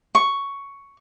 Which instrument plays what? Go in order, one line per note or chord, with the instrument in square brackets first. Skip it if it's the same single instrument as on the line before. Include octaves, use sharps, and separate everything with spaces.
[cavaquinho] C#6